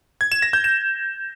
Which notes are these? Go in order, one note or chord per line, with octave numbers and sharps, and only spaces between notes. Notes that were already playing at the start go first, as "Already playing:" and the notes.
G#6
E7
A#6
G6
E7